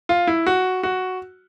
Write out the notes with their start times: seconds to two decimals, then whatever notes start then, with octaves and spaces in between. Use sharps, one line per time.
0.09 F4
0.27 E4
0.47 F#4
0.83 F#4